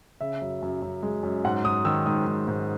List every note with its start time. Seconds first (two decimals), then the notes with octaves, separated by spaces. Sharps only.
0.21 C#3 E5
0.42 F#2
0.62 F#2
0.82 F#2
1.03 G#3
1.23 F#2
1.44 G#2 F#5
1.64 G#2 D#6
1.85 D#3 E6
2.06 G#2 D#6
2.26 D#3
2.47 G#2